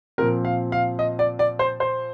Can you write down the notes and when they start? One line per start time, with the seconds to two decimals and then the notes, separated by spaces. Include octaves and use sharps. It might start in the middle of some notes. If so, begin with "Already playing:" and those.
0.18 A#2 F3 C4 A#4
0.45 F5
0.72 F5
0.99 D#5
1.19 D5
1.39 D5
1.59 C5
1.80 C5